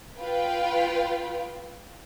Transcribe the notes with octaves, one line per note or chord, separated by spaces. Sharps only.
F4 B4 F5 G5